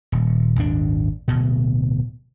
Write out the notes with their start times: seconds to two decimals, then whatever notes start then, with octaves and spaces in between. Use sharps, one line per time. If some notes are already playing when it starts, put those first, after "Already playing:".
0.12 D#1
0.56 D#1 G#1 D4
1.28 D1 B2